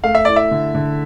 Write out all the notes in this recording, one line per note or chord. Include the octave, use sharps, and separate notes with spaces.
A3 F5
E5
E4 D5
E5
D3
D3